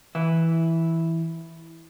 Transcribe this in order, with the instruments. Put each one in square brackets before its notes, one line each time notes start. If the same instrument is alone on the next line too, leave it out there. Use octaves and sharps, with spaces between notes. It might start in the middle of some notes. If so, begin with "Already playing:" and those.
[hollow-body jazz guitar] E3 E4